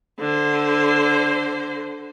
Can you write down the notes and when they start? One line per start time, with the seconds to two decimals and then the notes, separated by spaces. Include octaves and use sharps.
0.19 D3 C5